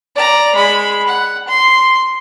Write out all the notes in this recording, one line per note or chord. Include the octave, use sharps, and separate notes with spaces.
D5 A#5
G#3 B5
F#5
C6